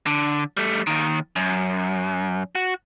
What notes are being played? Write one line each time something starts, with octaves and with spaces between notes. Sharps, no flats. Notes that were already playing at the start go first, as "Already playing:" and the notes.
D3
G3 A3
D#2 D#3
F#2
F#4